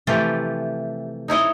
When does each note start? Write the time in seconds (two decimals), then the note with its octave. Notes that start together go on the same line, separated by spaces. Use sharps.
0.07 C3 E3 F3 A3 F4 G4
1.28 D#4 E4 C#5 D#5